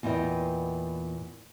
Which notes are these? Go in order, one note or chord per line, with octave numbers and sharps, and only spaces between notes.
E2 A#2 B3 D#5 G5